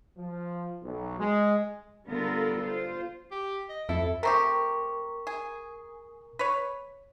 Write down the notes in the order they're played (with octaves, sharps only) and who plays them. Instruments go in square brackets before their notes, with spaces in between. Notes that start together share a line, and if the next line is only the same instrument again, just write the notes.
[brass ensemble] F3
B1
G#3
[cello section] D3 G3 B3 F4 A4 A#4
F4 C5
[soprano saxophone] G4
D#5
[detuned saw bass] F2 [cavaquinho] E4 E5 [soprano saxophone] A4
[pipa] A3 C4 G4 [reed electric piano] A#4 A#5 C#6
[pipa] G#4
B4 C#5